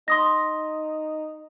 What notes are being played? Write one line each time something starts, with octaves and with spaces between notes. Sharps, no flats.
D#4 C6 D#6 A#6